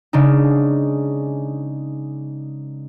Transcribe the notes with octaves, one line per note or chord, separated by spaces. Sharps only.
C#3 G#3 D4 D#4